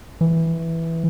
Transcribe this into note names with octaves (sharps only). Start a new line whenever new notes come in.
E3